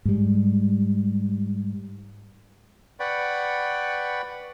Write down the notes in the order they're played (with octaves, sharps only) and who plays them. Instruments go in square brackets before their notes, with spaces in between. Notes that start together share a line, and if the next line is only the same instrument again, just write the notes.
[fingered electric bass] G#2 G3
[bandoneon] B4 D5 F#5 G5 B5 C#6